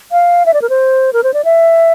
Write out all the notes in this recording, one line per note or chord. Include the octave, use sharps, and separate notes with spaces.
F5
E5
D5
A#4
C5
A#4
C5
D5
E5